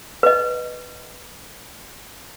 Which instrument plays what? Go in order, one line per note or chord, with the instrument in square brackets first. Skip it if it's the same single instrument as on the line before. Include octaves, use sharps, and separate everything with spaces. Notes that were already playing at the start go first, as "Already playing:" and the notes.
[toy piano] B4 D#5